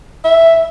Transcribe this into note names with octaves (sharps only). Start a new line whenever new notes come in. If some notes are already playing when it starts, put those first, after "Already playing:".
E5